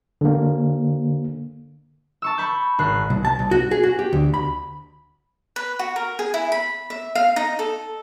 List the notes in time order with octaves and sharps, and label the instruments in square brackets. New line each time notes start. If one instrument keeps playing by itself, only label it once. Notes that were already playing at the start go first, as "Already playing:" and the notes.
[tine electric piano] D3 A#3
[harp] A5 C#6 E6
B5 C#6 G6
G#1 F#6 C7
[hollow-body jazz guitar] C2
A5
C2
F#4
G#4
F#4
G4
D2
B5
[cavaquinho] B4
F#4
A#4
G#4
E4
B5
E5
F5
D#4
A4